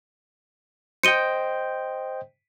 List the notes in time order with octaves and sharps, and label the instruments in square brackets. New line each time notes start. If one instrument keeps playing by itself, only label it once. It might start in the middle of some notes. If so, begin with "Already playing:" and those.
[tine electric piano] C5 D#5 G5 [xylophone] C#7 D#7 G7